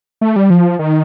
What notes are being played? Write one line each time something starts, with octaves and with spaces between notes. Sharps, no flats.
A3
G3
F3
D#3